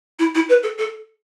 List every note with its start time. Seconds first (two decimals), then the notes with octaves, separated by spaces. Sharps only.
0.19 E4
0.35 E4
0.49 B4
0.63 A4
0.78 A4